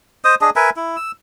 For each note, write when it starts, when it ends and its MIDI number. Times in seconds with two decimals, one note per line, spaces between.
0.25 0.35 72
0.25 0.35 75
0.25 0.35 87
0.41 0.50 62
0.41 0.50 68
0.41 0.50 75
0.56 0.70 70
0.56 0.70 71
0.56 0.70 76
0.56 0.70 80
0.76 0.96 64
0.96 1.12 88